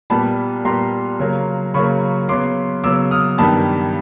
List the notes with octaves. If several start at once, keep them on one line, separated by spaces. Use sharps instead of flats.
A#2 G3 B3 A5 B5
A#2 G3 B3 A#5 C6
C#3 F#3 A#3
C#3 F#3 A#3 B5 C#6
C#3 F#3 B3 C6 D6
C#3 F#3 B3 D6 E6
D#6 F6
G2 D#3 G3 B3 A5 B5